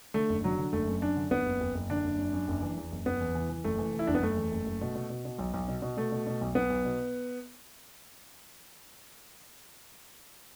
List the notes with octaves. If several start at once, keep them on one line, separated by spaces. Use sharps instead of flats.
D3 A3
F#1
D3 F#3
D3
F#1 A3
F#2
F#2 D4
D3
F#1 B3
F#1
F#1
F#1
D3 D4
F#1
F#2
F#2
F#1
E3
E2
F#1
F#1 B3
E2
E3
E3
F#1 A3
E3
E3
E4
F#1 D4
B3
F#1 A3
E2
F#1
F#1
B2
B2
B2
B2
B1
B1
B2
B2
B2 A3
B2
B2
B1
B1 B3
B1
B2